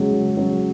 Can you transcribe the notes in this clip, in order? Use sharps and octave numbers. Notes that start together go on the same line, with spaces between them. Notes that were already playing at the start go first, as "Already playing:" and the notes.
Already playing: C#3 F#3 G#3 C#4
C#3
F#3 C#4